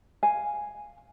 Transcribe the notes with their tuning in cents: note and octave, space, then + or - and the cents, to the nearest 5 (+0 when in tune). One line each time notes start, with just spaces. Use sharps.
F5 +0 G#5 +0